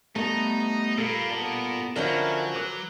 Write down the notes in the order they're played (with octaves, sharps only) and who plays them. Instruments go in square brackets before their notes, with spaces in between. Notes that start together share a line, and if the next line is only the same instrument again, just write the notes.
[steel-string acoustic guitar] G2 [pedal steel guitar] A3 B3 A5 [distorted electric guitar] D#4
[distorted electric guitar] A#2 [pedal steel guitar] A4 F5 B5
[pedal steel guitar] B3 A4 D5
[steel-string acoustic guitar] D3 F3 C#4 [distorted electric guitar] F#3 [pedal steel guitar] E4 A#4
[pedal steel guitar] B4 D6 F#6